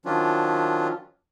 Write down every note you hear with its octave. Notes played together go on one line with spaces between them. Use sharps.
D#3 F3 F#3 C#4 D4 F4